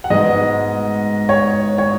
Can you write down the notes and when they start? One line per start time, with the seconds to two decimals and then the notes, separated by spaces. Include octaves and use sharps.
0.04 F#5
0.10 G#2 G#3 B3 D#5
1.29 C#5
1.78 C#5